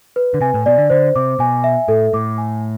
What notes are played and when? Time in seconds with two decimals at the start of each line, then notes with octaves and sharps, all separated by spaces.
0.16 B4
0.34 D3
0.41 C3 G#5
0.54 A2
0.66 B2 D5
0.78 D3
0.90 D3 C5
1.16 C3 D6
1.39 B2 G#5
1.64 E5
1.88 A2 A4
2.13 A2 D6
2.38 G#5